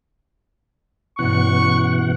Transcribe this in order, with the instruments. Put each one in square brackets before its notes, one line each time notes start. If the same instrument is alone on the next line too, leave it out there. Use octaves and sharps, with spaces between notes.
[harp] G2 C#4 [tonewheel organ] B2 E3 F#5 [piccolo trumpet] C#6